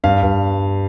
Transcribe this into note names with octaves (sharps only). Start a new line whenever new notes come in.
G2 F5
G2